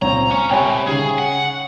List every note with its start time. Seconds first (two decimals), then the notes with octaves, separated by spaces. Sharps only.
0.02 C#2 A#2 C4 C#5 A#5
0.31 C#4 C#6
0.50 C2 C3 C#5 E5 G5 G#5 B5
0.87 C#3 C#4 D#4 G#4
1.18 F#5